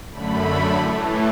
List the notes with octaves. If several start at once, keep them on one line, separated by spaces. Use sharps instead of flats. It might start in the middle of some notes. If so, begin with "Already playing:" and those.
F#2 D3 A3 B5
A2 E3 A3